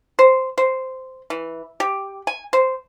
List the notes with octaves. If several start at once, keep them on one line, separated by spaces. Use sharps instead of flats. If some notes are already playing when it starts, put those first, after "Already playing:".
C5
C5
E3
G4
G#5
C5